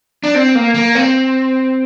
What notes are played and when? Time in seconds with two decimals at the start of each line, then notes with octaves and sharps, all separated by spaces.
0.23 D4
0.35 C4
0.55 A#3
0.74 A#3
0.95 C4